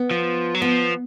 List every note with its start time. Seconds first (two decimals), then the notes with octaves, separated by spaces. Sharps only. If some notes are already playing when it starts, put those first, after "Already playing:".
Already playing: B3
0.11 F3
0.54 F#3
0.61 F3 B3